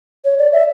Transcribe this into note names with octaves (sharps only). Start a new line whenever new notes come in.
C#5
D5
E5